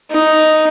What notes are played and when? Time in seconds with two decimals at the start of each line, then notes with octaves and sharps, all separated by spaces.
0.11 D#4